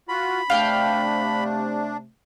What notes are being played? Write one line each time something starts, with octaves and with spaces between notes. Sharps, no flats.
F4 F#4 B5
C3 A3 D4 F5 G5